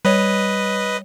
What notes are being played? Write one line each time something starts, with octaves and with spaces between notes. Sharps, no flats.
G3 B4 C#5 D#5